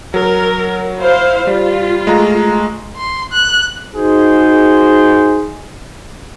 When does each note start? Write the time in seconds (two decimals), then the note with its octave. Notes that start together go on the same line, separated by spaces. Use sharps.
0.14 F#3 A#4
0.98 E4 C5 F5
1.47 G3 F4
2.07 G#3 A3 A#5
2.96 C6
3.33 F#6
3.95 D#4 F#4 G#4 C5